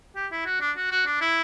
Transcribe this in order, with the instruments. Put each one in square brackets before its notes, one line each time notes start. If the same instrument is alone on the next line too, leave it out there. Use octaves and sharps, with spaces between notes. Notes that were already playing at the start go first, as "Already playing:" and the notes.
[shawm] G4
E4
F#4
D4
F#4
F#4
D4
E4